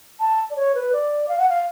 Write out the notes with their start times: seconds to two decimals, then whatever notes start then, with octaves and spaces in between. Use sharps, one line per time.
0.20 A5
0.50 D5
0.56 C#5
0.75 B4
0.93 D5
1.29 F5
1.39 F#5
1.49 F5